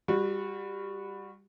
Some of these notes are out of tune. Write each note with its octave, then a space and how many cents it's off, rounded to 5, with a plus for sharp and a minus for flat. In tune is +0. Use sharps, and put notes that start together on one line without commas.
G3 +15 F#4 -15